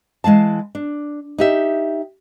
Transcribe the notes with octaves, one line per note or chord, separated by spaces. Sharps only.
E3 G#3 F5 A5
D4
D#4 G4 E5